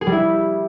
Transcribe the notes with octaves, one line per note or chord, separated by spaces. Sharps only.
G#4
G3
E4